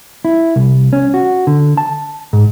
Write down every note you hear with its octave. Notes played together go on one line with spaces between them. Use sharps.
E4
C2
C#4
F#4
D3
A5
G#2